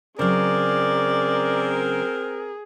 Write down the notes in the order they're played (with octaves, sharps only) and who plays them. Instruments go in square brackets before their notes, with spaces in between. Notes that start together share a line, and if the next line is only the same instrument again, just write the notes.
[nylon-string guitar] C#3 F#3 [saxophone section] C4 A#4 [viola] G#4 [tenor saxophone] D5